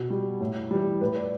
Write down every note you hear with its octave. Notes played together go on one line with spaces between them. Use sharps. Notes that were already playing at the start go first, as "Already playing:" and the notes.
Already playing: B2
G3
A2
E3 G3
A2 B4
D5